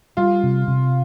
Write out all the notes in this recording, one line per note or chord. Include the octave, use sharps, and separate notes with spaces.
G3 F4
C3
C3